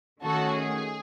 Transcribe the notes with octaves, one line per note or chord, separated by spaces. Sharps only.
D#3 A3 C#4 F#4 A4
G#4